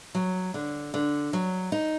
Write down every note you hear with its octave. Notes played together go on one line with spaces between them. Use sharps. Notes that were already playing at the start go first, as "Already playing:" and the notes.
F#3
D3
D3
F#3
D#4